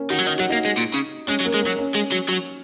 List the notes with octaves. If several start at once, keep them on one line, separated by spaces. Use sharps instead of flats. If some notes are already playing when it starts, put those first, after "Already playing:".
Already playing: A#3 C#4
D#3 F#4
F#3
D#3 D#4
F#3 F#4
A#3 D#4
G#3
A#2
C#3
G#3 C#4
F#3
A#3
G#3
F#3 A#3
C#4
G#3
F#3
F#3